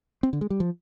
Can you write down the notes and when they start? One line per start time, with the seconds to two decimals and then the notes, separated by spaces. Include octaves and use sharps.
0.23 C4
0.33 D3
0.41 G#3
0.50 G3
0.60 F3